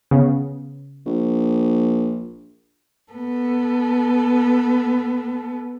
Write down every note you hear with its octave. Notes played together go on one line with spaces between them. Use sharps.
C#3 B3
A#1
B3 A4